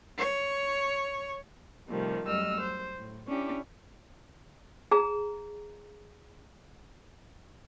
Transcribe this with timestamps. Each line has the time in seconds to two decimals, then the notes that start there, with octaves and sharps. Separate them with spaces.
0.19 C#5
1.87 C3 D#3 F3 G3 A3
2.26 F#2 G3 A3 D#5 E6 F6
2.60 C5
2.96 A2
3.27 C#4 D4 E4 G4
4.91 G#4 A#5